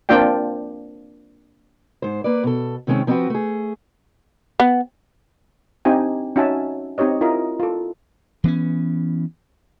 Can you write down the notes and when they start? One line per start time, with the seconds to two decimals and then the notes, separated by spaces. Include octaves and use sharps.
0.09 A#3 C4 D4 F4 D5 G5
2.02 G#2 C5
2.24 A#3 B4 D5
2.43 B2 A4
2.87 C3 D#3 G#3 C4 C#4
3.07 F3 C4 D#4 E4 F#4 B4
3.30 A3 G#4
4.60 B3
5.85 C4 D4 D#4 G4 G5 G#5
6.36 C#4 D#4 F#4 E5 G#5 A5
6.98 C4 D#4 G4 C#5 D#5
7.21 E4 F4 A#4 D#5
7.60 F4 A4
8.44 E3 B3 C#4